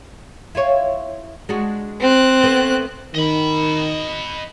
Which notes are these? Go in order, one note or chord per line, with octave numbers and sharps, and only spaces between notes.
E4 F4 C#5
G#3 D4 F#4
C4 F#6
A3 B3
D#3 D#5 B5